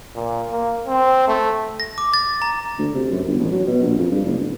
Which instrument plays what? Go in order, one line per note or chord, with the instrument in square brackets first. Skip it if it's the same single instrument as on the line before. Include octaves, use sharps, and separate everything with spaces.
[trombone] A#2
A#3
C4
A3
[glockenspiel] A#6
D6
A6
A#5
[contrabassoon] D2
C3
F#2
G1
A1
F#3
B2
A#1
F2
G2
F#1
D1